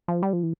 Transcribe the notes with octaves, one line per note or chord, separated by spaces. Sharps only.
F3
G3
F3
E3